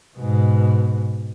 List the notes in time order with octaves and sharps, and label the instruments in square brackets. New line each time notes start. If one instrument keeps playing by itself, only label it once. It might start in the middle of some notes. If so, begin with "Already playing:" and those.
[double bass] G#2 B2